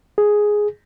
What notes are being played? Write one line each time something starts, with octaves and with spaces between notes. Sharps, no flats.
G#4